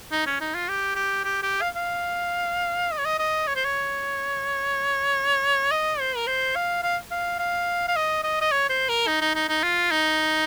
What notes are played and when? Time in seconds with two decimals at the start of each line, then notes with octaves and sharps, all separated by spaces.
0.12 D#4
0.27 C#4
0.41 D#4
0.55 F4
0.68 G4
0.96 G4
1.24 G4
1.43 G4
1.61 F5
1.76 F5
2.92 D#5
2.98 C#5
3.05 D#5
3.19 D#5
3.47 C#5
3.56 C5
3.65 C#5
5.71 D#5
6.00 C5
6.16 A#4
6.27 C5
6.56 F5
6.83 F5
7.11 F5
7.39 F5
7.88 F5
7.96 D#5
8.24 D#5
8.41 D#5
8.52 C#5
8.69 C5
8.89 A#4
9.07 D#4
9.21 D#4
9.35 D#4
9.49 D#4
9.63 F4
9.91 D#4